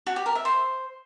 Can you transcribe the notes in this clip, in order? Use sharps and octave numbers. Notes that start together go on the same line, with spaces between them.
F#4
G4
A#4
E5
C5